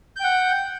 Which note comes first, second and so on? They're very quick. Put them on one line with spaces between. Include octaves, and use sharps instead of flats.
G6 G5 F#5